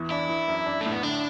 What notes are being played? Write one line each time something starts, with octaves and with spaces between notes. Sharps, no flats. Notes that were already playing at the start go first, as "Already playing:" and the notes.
Already playing: E2 E3
D4 E4
E3
F#2
D4
A2 A3
B3
D3 D4